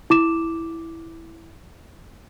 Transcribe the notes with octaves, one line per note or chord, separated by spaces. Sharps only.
E4 D6 E7